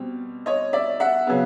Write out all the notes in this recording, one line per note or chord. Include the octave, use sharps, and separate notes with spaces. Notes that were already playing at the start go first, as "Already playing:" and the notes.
Already playing: B2 G3 C4
C#5 D#5
D5 E5
E5 F#5
C#3 F#3 B3